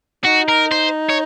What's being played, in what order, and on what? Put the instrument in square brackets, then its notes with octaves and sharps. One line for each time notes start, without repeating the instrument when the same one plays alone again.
[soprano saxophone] D#4 [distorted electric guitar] F#4
[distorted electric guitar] A#4
C5
C#5